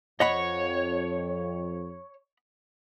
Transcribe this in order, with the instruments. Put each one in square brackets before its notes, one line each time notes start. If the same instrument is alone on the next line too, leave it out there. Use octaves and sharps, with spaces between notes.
[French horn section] F2 [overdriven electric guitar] C#5 [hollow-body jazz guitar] D#5 F#5 B5